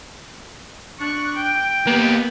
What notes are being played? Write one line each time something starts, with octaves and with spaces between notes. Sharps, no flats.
D4 C#6 F#6
G5
A#3 B3 G4